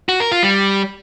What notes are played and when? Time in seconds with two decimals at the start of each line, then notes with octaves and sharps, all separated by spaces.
0.09 F#4
0.20 A#4
0.31 F4
0.43 G3